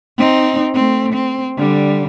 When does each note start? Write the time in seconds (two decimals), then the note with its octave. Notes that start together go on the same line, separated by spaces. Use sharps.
0.17 C4 D#4
0.74 A3 C4
1.13 C4
1.57 D3 G3